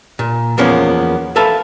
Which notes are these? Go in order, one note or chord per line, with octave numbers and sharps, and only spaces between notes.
A#2
E2 F3 A#3 B3 C#4
A4 B4 E5 F5 A5